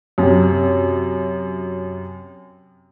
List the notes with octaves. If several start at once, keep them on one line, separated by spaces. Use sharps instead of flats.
F#2 C3